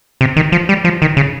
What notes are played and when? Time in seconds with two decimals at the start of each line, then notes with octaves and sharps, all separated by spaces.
0.21 C3
0.36 D#3
0.52 F3
0.69 G3
0.84 F3
1.02 D#3
1.17 C#3